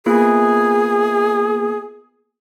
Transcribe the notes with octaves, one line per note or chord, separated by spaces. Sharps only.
A#3 B3 F4 G#4